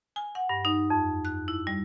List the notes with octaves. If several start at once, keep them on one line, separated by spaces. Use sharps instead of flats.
G#5
F#5
G2
D#4
F2
F#6
E4
G3